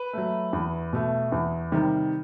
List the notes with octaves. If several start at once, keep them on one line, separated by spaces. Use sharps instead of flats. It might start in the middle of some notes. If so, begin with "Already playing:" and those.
Already playing: B4
F#3 A3
E2
B2 A3
E2
C3 D#3 G3